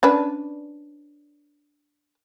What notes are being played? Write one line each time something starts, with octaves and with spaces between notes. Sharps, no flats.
C#4 D4 B4